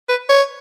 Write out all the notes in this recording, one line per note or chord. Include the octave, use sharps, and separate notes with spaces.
B4
C#5